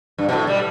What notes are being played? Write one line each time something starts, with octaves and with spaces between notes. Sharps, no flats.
G2
B2
A2
G3